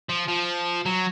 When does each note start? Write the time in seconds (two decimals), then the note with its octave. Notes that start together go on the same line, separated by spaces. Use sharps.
0.09 F3
0.28 F3
0.86 F#3